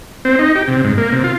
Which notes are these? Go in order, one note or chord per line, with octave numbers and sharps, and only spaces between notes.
C4
D#4
G4
C3
G#2
A#3
C3
F4